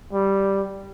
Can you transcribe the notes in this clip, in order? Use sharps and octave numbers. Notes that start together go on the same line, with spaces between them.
G3